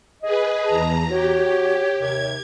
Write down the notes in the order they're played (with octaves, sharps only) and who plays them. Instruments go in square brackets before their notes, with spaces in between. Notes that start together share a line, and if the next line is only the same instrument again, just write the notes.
[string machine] G#4 B4 [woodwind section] D#5
[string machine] E2 A#5 [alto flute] A5
[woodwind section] F#4 [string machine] G4 [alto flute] C#5
[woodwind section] D#2 C3 [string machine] G#6